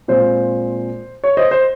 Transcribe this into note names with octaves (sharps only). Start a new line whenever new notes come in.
A#2 G#3 C4 C5
C#5
C5 D#5
C5